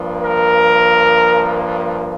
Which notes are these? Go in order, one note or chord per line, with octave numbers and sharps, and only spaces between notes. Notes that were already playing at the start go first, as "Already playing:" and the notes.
Already playing: G2 F3 A#3
A#4